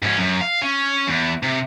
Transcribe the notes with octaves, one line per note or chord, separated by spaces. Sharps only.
G#2 C#4
F#2
F5
C#4
E2
C3